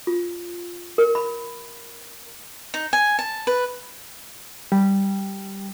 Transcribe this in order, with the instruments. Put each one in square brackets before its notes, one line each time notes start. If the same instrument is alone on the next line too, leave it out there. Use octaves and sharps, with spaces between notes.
[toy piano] F4
A#4
B5
[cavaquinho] D#4
G#5
A5
B4
[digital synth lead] G3